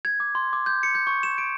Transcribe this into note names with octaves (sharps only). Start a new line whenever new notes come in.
G#6
D6
C6
D6
G6
C#7
G6
C#6
E7
D7